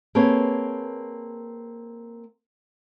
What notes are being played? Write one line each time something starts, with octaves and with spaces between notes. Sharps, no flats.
A#3 C4 G#4 A4 B4 C#5